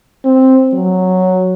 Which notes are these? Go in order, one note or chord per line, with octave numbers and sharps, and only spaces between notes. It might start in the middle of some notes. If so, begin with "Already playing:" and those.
C4
F#3